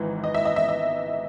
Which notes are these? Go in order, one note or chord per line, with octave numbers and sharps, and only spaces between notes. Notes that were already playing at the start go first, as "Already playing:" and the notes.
Already playing: G#1 G#2 E3
D#5
E5
D#5
E5
D#5